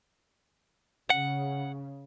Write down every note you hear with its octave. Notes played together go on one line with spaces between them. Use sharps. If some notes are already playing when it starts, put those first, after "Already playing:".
C#3 F#5